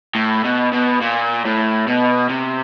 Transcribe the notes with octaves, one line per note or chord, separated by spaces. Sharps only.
A2
B2
B2
A#2
A2
B2
C3